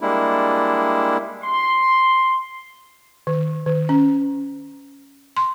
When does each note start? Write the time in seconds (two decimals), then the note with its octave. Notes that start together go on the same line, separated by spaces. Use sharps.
0.01 G3 G#3 A#3 D4 E4
1.42 C6
3.27 D#3
3.66 D#3
3.89 C#4
5.37 C6